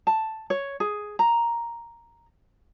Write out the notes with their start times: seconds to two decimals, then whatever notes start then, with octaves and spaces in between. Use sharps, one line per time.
0.07 A5
0.50 C#5
0.80 G#4
1.19 A#5